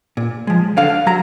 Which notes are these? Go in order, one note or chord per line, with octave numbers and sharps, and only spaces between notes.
A#2
F3 G#3
D3 F5
F#3 A#5